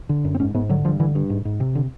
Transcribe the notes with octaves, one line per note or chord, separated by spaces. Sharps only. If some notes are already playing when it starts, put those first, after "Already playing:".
D3
F#2
C4
G#2 C#4
G#2 B3
D3 F#3
G2 F3
D3 E3
G2
G#2
G#2
C3
D3